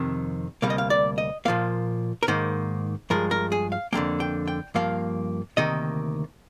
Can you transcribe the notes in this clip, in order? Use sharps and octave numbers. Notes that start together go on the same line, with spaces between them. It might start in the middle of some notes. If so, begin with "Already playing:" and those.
Already playing: F2 C3 D#3
D2 C3 G3 A#3 F5
D#5
F5
D5
D#5
A#2 F3 A#3 F5
A#4
G#2 D#3 A#3 C5
G2 F3 G#3 A#4
A#4
G#4
F5
F2 D3 F3 A#3 G5
G5
G5
G2 F3 A#3 F5
D2 C3 D#3 A#3 D#5